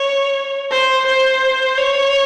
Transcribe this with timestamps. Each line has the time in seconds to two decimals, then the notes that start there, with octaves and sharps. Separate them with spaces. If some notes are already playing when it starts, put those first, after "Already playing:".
Already playing: C#5
0.71 C5
1.06 C5
1.78 C#5